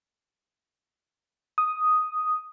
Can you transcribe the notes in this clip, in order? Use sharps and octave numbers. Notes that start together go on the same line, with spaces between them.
D#6